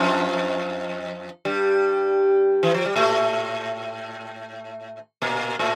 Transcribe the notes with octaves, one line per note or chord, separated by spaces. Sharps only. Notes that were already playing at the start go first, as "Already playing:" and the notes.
Already playing: F2 F3
G2 G3
E3
F3
G3
A2 A3
A#2 A#3
A2 A3